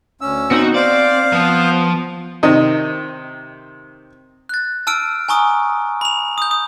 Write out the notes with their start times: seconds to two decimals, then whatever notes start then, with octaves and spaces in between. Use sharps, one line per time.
0.21 D2 C#4 E6
0.51 B3 C4 D#4 F#4
0.75 C4 C5 D5 F5
1.33 F3 B3
2.43 C3 D#3 D#5
4.49 F#6 A6
4.87 A5 E6 F6 D7
5.29 G#5 A#5 C#6 D#6
6.01 B5 F7
6.38 D#6 G6
6.51 D#6